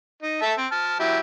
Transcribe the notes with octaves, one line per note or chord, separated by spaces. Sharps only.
D#4
A4 E5 A5
C4
A5 F6
F#3 E4 G4